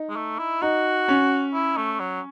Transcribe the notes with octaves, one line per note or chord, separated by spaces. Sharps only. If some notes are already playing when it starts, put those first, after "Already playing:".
Already playing: D#4
G#3
A3
E4
D#4 F#4
C#4
E4
A3
F#3